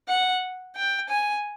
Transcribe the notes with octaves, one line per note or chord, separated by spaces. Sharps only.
F#5
G5
G#5